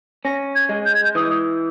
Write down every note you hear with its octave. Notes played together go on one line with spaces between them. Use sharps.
C#4 A#6
G#6
G#3
G6
G#6
G6
E3 D#6